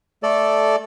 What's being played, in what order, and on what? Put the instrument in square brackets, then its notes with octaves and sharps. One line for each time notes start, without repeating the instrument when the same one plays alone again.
[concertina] A3 A4 D5